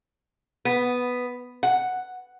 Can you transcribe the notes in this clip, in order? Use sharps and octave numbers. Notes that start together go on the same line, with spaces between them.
B3
F#5